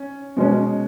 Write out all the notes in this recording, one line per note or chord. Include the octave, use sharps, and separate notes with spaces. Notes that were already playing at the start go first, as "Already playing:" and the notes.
Already playing: C#4
B2 G#3 C#4